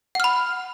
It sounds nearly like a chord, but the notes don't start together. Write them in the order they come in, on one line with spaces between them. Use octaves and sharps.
F#5 F6 B5